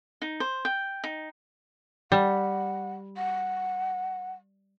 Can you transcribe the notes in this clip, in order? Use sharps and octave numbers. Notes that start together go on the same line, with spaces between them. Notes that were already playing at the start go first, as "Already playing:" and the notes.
D#4
C5
G5
D#4
G3 F#5
F#5